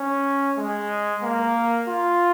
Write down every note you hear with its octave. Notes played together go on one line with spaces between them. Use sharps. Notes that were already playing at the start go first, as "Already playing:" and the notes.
Already playing: C#4
G#3
A#3
F4